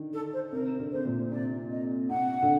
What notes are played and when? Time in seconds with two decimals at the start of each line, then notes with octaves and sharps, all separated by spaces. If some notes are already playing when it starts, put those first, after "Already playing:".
Already playing: D3 D#3
0.13 A4
0.33 C5
0.52 C3 A#4
0.79 D3
0.92 C3 C5
1.05 A#2
1.32 C3 D5
1.70 D#5
2.10 C3 F#5
2.42 D3